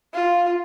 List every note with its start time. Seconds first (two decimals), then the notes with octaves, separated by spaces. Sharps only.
0.14 F4